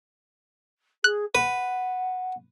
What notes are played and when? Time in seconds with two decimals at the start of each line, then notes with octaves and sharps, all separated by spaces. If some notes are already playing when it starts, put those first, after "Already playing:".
1.04 G#4 F#6
1.35 B4 F#5